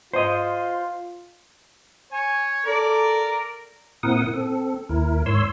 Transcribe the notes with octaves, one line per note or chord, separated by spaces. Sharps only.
F4 C5 D#5
C#5 G#5
A4 A#4 D5
A#2 C4 E4 A#4 F#5 D#6
C4 A4
D#2 E4 A#4
G#2 C#5 C6 E6